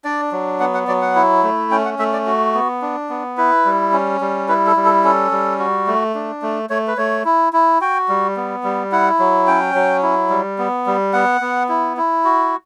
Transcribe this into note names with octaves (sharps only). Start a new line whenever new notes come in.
D4 D5
F#3
B3 F#5
F#5
F#3 D5
F#5
E4
A3
C#4 G5
F#5
A3 E5
D5
F#4
B3
D4
B3
E4 B4
G3
C#4
G3
E4 B4
A4
G3
A4
C#4 A4
G3
F#4
A3
D4
A3
A3 C#5
B4
A3 C#5
E4
E4
F#4 G5
G3
B3
G3
E4 F#5
F#3
C#4 G5
F#3
E4
G3
B3
G3
B3 F#5
B3
E4
E4
F#4